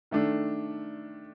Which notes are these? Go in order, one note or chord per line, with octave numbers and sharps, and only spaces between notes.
D#3 A3 D4